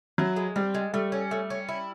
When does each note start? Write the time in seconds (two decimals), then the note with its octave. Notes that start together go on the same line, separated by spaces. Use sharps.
0.18 F#3 E4
0.36 G#3
0.56 G3 C4
0.75 G#3
0.93 G3 A3
1.12 C#4
1.31 A3
1.50 C#4
1.69 E4